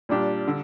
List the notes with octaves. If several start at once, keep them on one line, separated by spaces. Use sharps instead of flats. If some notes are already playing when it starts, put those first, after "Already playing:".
A#2 G3 D4 G4
D3